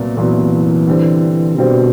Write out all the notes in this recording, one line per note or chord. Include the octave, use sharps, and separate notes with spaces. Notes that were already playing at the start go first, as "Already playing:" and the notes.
Already playing: C2 A#2 F#3 B3
C2 A#2 E3 F#3 B3
D3 G3 C4
B2 D3 G3 C4